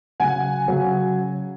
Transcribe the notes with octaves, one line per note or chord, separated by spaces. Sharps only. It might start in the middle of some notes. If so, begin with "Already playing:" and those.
C#3 F#3 F#5 G#5
C#3 F#3